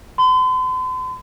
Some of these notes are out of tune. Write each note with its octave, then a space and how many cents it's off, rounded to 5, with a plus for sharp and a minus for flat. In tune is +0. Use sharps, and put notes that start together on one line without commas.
C6 -45